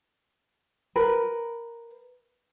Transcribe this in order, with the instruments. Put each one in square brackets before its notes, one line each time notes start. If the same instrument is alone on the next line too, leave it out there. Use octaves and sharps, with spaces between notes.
[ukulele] A#4 B4